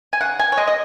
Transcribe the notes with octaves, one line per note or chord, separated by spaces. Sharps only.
G#5
C#3 F#5
G#5
C#5
G#3 D#5
D#5